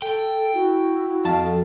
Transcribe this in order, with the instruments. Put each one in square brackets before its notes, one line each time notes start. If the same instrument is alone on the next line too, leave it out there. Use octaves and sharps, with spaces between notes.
[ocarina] A4 [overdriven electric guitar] G5
[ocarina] E4 [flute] F#4
[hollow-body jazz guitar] F2 A5 [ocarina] F5
[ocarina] A4